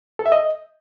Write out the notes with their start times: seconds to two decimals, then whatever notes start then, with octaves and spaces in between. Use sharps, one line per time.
0.19 A4
0.26 E5
0.32 D#5